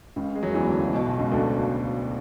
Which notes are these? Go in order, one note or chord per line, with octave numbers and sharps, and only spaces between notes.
C#2 C#3
G#3
F#2 F#3
E2 E3
D2 D3
C#2 C#3
B1 B2
B1 B2
C#2 C#3
D2 D3